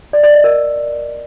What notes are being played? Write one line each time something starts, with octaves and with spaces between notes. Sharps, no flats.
D5
D5
D#5
A#4